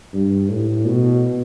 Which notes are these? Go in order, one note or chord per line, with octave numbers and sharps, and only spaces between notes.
G2
A2
B2